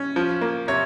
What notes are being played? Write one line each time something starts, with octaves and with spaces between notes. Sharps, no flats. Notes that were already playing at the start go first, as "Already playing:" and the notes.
Already playing: C#4
F3
A#3
C3 C#5